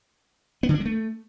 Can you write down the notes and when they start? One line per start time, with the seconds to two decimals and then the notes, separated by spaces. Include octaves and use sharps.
0.63 B3
0.69 D3
0.74 D4
0.80 G#3
0.86 A3